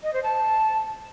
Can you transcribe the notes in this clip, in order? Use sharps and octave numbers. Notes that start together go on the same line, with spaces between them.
D#5
C5
A5